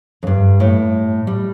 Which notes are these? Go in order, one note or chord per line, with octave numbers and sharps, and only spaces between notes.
F2
G2
A2
G3